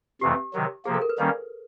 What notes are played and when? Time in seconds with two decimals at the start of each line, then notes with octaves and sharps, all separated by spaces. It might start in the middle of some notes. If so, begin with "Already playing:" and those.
0.21 F2 C3 E3 A3 G4
0.53 C3 D#3 F#3
0.85 C3 F3 A#3 G#4
0.94 A4
1.02 A#4
1.10 B4
1.18 D#3 G3 A#3 C#4 C5